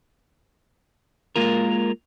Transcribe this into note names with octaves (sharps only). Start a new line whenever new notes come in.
G#3 A#3 F4 A#4